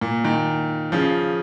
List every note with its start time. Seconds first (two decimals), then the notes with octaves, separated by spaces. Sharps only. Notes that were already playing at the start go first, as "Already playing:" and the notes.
0.01 A#2
0.24 A#2 D#3
0.92 C#3 F3